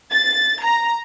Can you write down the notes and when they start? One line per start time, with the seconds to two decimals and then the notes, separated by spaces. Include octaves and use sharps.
0.13 A6
0.65 A#5